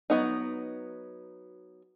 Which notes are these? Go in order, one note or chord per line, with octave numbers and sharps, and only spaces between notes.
F#3 B3 D#4